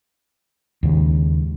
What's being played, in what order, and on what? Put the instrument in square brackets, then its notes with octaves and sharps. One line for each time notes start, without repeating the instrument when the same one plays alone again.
[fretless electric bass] D#2 G#2 C#3